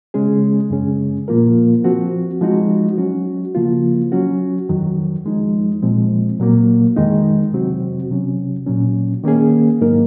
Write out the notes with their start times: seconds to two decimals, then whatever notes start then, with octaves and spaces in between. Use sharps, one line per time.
0.14 C#3 G#3 C#4 G#4
0.70 F#2 C#3 G#3 C#4 G#4
1.28 A#2 F3 A#3 F4 A#4
1.84 F3 C4 F#4
2.41 F3 G#3 D#4 F#4
2.98 F#3 C#4 F#4
3.55 C#3 F3 A#3 F4
4.12 F#3 C#4 F#4
4.69 F2 D#3 F#3
5.26 F3 G#3 D#4
5.82 A#2 F3 G#3 C4
6.39 A#2 F#3 A#3
6.96 F2 D#3 G#3 D#4
7.53 C3 F#3 C4 F#4
8.10 C3 F#3 C#4
8.67 A#2 F#3 C#4
9.24 D#3 A#3 C#4 G#4
9.81 G#2 F#3 A#3 D#4 A#4